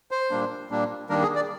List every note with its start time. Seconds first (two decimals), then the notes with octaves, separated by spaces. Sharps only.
0.11 C5
0.31 A#2 G3 A#3 D4
0.70 A#2 G3 A#3 D4
1.09 D#3 G3 A#3 D4 A#4
1.22 G#4
1.36 D5